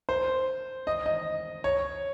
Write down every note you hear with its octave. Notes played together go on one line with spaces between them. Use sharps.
C5
D#5
D#5
C#5